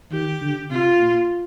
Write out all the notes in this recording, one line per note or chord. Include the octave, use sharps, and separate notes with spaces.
D#3 G4
D3
C3 F4
A#2